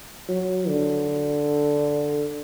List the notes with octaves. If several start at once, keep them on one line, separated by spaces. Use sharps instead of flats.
F#3
D3